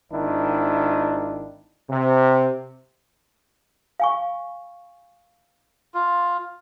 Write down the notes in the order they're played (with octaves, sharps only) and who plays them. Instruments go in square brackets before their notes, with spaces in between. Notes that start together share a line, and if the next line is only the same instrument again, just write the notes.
[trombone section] G#1 D#3 D4 E4
C3
[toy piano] F5 G#5 C#6
[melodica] F4